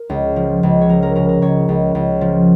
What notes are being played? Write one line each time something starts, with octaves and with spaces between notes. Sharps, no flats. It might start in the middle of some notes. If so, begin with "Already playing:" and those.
Already playing: A#4
C#2
F3
C#2
C#5
F3 A#4
A#4
C#3 A#4
A#4
C#2 C#5
C#2
C#2
F3